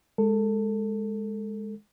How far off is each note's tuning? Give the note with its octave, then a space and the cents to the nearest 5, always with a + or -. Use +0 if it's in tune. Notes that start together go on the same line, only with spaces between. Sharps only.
G#3 +0 A4 +20